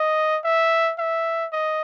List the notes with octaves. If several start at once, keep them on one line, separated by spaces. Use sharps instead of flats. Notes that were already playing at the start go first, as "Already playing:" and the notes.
Already playing: D#5
E5
E5
D#5